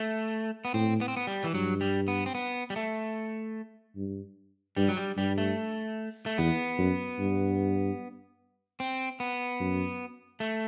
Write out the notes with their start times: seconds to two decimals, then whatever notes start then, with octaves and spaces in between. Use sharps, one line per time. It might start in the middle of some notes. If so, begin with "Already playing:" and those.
Already playing: A3
0.65 B3
0.74 A2 C4
1.01 B3
1.08 C4
1.17 B3
1.27 G3
1.44 E3
1.54 G2 F#3
1.81 G3
2.08 B3
2.26 C4
2.35 B3
2.70 G3
2.76 A3
3.96 G2
4.77 G2 G3
4.88 F#3
4.97 G3
5.17 G2 G3
5.38 A3
6.26 A3
6.38 E2 B3
6.79 F#2
7.19 G2
8.80 C4
9.20 B3
9.60 F#2
10.40 A3